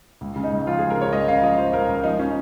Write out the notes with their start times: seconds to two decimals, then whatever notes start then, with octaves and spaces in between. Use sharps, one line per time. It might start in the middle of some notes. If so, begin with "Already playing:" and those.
0.21 C#2
0.36 C#3
0.44 D#4
0.52 C#2
0.67 F3 F4
0.79 G#4
0.82 F3
0.90 A#4
0.97 C#3 C#5
1.13 C#2 D#5
1.28 C#3 F5
1.43 F3 D#5
1.58 F3 C5
1.73 C#2 A#4
1.89 C#2
2.04 F3 D#4
2.19 F3 C#4